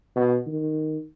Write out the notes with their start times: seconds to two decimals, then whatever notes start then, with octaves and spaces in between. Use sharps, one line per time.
0.16 B2
0.47 D#3